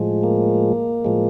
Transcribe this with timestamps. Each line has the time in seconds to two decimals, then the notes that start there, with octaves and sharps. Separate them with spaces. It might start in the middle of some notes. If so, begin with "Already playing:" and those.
Already playing: A2 F3 G#3
0.24 A#3
1.05 A2 F3 G#3